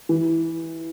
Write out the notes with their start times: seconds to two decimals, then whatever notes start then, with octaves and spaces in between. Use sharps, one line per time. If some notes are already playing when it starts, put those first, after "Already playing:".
0.09 E3